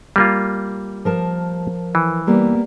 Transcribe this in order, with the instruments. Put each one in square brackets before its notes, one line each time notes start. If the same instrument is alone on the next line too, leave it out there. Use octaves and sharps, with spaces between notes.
[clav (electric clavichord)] G3 A#3 F4
[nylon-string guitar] F3 A#4 A5
[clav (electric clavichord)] E3
[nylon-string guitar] G3 A#3 B3